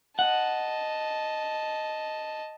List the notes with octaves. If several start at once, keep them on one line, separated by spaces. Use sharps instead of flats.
D#5 F#5 A5